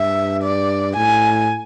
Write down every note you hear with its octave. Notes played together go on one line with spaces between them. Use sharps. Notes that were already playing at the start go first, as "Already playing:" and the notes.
Already playing: G2 E5
D5
A2 G#5